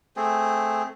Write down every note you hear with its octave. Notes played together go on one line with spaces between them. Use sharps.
A3 C4 G#4